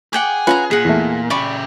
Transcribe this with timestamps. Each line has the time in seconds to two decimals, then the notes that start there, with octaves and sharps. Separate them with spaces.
0.13 G#4 F#5 G5 D6
0.47 C#4 F4 B4 F#5 G#5 A#5
0.71 A#2 G#4 F#5
0.85 E2 A3
1.30 C#3 G4 D5 B5 C#6